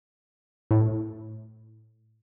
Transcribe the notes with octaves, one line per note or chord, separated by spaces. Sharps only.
A2